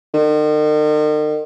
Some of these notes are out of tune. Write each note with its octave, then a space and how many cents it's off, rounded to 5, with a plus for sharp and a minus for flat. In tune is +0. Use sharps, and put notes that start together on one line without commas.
D#3 -45